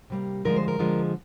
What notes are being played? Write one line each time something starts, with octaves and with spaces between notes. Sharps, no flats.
C3 G3 A#3
D3 F3 G#3 A#4
C5
A#4
D3 F3 G#3